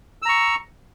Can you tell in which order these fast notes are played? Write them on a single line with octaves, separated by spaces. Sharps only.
E6 A#5 C#6